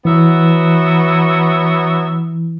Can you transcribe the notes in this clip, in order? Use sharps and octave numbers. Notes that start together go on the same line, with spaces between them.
E3 F#3 B3 E5